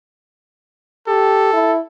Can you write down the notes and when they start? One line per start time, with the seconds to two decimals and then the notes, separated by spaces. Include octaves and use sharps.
1.08 G4 A4
1.53 E4